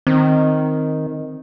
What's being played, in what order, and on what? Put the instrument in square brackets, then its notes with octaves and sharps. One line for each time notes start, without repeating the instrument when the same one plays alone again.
[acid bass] D#3 [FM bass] C4